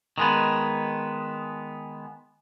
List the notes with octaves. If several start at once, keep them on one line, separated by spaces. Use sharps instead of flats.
D#3 G#3 B3